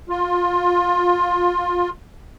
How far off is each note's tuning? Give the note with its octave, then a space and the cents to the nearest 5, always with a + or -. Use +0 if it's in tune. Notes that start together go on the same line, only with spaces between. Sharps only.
F4 +20